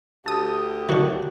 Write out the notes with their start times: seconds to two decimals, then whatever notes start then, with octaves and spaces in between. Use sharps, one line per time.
0.26 D2 G4 A5 D#6
0.89 D#3 F#3 D4 F#4